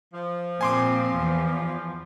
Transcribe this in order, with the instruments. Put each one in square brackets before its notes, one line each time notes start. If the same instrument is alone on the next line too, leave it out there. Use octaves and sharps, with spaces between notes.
[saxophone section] F3
[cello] A#2 C4 [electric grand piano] G#5 C6 D6
[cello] E2 E3